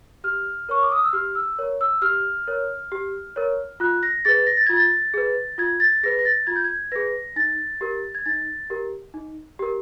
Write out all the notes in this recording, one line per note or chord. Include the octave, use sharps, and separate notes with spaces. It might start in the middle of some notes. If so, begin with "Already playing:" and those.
G4 F6
A#4 C#5 C#6
D6
D#6
E6
G4 F6
E6
A#4 C#5
E6
G4 F6
A#4 C#5
G4
A#4 C#5
F4 F#6
A#6
G#4 B4 A6
A#6
A6
F4 G#6
A6
G#4 B4
F4 G#6
A6
G#4 B4 A#6
A#6
A6
F4 G#6
G6
G#6
G#4 B4 A#6
D#4 A6
G4 A#4
G#6
D#4 A6
G4 A#4
D#4
G4 A#4